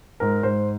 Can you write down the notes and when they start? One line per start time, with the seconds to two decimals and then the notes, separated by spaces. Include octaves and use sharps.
0.20 G#2 A#4
0.43 G#2 C5